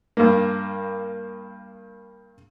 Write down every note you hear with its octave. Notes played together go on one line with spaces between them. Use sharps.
G2 A#3